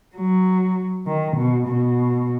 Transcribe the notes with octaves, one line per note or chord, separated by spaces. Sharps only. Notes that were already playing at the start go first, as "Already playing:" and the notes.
F#3
D#3
B2
B2